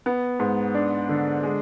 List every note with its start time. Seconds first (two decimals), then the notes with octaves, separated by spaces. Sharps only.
0.06 B3
0.40 G#2
0.74 D4
1.09 D3
1.43 G#3